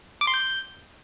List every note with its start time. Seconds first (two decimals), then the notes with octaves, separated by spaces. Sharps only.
0.21 D6
0.27 C6
0.34 G6